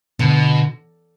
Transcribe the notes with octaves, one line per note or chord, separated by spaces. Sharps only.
B2 D3